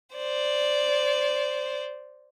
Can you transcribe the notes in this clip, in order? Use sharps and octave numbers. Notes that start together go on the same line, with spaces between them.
C5 D5